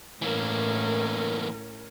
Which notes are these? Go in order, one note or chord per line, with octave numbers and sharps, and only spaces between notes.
A2 E3 A#3 C#4 A#4